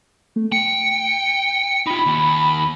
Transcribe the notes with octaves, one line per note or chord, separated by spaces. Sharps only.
A3
G5 C#7
D#4 F4 B5
D#2